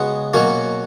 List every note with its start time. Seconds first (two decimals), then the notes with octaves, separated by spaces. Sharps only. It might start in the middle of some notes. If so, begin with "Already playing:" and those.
Already playing: C#3 G#3 B3 F#4
0.34 B2 F#3 A#3 C#4